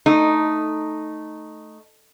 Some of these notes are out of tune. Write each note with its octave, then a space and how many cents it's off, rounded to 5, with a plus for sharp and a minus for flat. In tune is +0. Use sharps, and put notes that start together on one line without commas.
A3 +0 D#4 +0